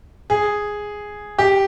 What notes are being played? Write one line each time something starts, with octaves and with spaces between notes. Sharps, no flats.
G#4
G4